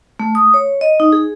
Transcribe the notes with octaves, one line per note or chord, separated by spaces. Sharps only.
A3
D#6
C#5
D#5
D#4
G#4